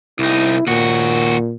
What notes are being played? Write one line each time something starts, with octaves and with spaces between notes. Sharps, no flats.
C2 D#4 E4
D#2 A#2 F#4